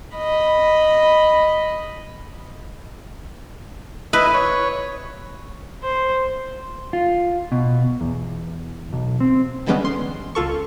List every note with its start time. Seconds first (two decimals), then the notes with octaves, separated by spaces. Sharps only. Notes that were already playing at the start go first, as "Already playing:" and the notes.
0.16 D#5 B5
4.13 E4 B4 D#5
4.34 C#5
5.83 C5
6.93 F4
7.52 B2
8.01 E2
8.93 B1
9.20 C4
9.66 D3 E3 G3 G#3 B3 C#4
9.85 C6
10.35 C#2 F4 A4 C#6